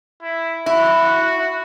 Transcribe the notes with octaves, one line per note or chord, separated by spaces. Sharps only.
E4
E4 F#4